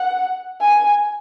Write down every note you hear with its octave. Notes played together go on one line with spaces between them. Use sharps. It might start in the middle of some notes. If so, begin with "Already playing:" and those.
Already playing: F#5
G#5